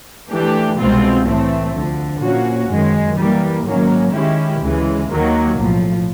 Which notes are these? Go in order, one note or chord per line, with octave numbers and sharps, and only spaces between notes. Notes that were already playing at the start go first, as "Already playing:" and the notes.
E3 A3 D4 G4
C2 B2 G#3 C4 F4
A2 E3 A3 C4
D2 D3 F3
A#2 F3 A#3 C#4 F#4
F#2 D#3 G#3
E3 G3 A#3
G#2 D#3 F#3 A#3 C#4
D#3 G#3 C#4 E4 G4
D2 C#3 E3 G#3
D#2 D#3 F#3 A#3
B1 A2 F3